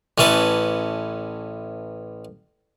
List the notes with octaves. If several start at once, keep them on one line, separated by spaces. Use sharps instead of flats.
A1 E3 C#4 A4 B4